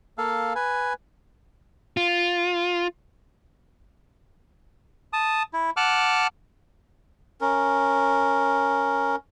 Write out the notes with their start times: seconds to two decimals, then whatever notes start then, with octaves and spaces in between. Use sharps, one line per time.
0.18 A#3 A4 F5
0.56 B4 G#5
1.97 F4
5.13 A5 D#6
5.53 E4
5.77 F#5 A5 D6 F6 F#6
7.41 C#4 A#4